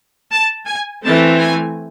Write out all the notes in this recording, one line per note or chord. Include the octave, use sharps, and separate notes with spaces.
A5
G#5
E3 A3 C4 A5
G#5